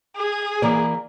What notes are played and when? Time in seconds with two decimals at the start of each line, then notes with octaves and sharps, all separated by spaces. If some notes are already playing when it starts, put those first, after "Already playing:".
0.17 G#4
0.62 E3 A#3 D5